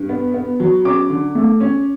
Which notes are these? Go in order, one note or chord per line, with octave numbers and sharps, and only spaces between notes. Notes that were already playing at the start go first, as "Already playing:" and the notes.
Already playing: G2
B3
B3
F#3
C#4 D6
D3
A3
C#4